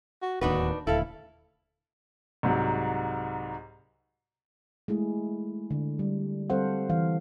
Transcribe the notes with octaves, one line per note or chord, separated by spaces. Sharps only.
F#4
D1 D#2 D4 D#4 F#4 B4
D#1 D2 E4 A4 F5
C2 G#2 F#3
G#3 A3 E4 G#4
D3
G3
G3 C4 A4 C5 F5 F#5
E3 F5